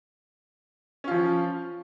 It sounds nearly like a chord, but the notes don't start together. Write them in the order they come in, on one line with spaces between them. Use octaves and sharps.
C#4 F4 F3